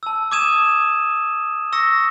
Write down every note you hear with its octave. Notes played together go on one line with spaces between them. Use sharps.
A5 E6
D6 D#6 G#6 D#7 E7
C#6 E6 A#6 C#7